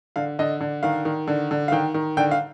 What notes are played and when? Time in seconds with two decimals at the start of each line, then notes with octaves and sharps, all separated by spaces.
0.16 D3 F5
0.39 D3 D#5
0.60 D3
0.83 D#3 F5
1.05 D#3
1.27 D3
1.51 D3
1.68 F5
1.72 D#3 G5
1.94 D#3
2.17 D3 G5
2.31 F5